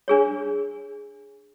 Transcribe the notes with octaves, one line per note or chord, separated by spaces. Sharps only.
D4 G#4 C#5